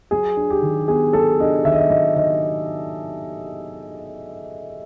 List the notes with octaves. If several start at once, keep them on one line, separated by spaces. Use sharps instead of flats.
F#3 G#4
D4
G4
D#3
B3 G#4
F#3 A4
D4 D#5
D#3 E5
D#5
E5
F#3 D#5
D#3 D#5